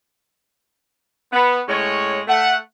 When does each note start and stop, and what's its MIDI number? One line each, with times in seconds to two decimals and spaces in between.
1.32 1.60 59
1.68 2.20 45
1.68 2.20 56
1.68 2.20 61
1.68 2.20 73
2.28 2.55 57
2.28 2.55 78